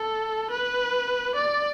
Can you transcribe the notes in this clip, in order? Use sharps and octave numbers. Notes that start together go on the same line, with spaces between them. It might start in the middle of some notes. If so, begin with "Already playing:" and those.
Already playing: A4
B4
D5